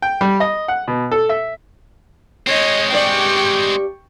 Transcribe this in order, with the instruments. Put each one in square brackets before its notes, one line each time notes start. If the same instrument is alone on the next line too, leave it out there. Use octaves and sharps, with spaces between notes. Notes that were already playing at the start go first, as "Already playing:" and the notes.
[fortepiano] G5
G3
D#5
F#5
B2
A4
E5
[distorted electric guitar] G#3 C4 [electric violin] C#5 D#5
[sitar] G2 C#5 D5 [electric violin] G5 C#6